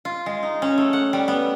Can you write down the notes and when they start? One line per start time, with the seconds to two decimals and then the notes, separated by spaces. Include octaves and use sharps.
0.05 F4
0.26 G#3
0.43 D#4
0.62 C#4
0.78 A3
0.93 F#5
1.13 G3
1.28 B3